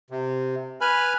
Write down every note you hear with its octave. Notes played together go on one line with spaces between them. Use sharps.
C3
B4 G#5 B5 F6